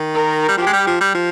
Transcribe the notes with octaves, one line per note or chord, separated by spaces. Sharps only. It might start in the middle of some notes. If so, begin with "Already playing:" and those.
Already playing: D#3
A#4
G3
F3 G4
G#3
G3
F3
G3
F3